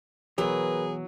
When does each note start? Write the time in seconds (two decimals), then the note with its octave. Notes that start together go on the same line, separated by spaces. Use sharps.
0.38 B2 E3 F#3 G#4 A#4 B4